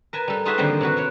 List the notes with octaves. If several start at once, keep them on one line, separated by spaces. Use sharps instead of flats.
A#4 B4 G#5 A5
G3 A4
D#4 F4 F#4 G#4 B4 E5
D3 D#3 F3 G3 A#3 C4
C3 E4 F#4 B4
E4 C#5